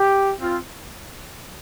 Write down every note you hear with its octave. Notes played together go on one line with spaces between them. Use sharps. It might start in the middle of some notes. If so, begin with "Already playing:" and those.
Already playing: G4
C4 F4